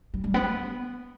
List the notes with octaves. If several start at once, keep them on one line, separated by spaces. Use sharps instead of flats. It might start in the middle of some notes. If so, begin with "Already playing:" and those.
G3
G3
B3